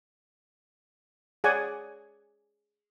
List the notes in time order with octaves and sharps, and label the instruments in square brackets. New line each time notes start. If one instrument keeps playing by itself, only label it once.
[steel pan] G#4 C#5 D5 F#5 G#5